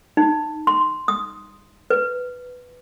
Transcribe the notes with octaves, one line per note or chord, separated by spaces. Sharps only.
D#4
C6
D#6
B4